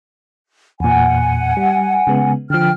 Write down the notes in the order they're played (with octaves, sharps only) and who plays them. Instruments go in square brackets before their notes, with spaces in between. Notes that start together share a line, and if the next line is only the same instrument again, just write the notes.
[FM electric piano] E2 A#2 [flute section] F#5 G#5
[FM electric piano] G3
C#3 G#3 B3
[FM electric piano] D3 F3 [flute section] G5 F6